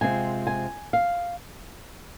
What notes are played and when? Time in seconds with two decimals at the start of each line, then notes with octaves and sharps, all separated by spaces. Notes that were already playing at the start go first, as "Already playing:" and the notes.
0.01 C3 G#3 C4 F4 G#5
0.47 G#5
0.93 F5